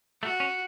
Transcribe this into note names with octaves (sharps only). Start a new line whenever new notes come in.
A3 F#4
C#4